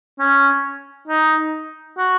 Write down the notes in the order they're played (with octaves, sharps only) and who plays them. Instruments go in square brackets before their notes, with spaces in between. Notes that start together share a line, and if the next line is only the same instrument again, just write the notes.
[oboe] C#4
D#4
F#4